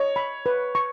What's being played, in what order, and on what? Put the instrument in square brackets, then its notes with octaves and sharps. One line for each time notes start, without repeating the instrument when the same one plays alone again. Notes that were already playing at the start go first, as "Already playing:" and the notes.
Already playing: [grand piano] C#5 [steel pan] D#5
[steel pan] B5
B4
C#6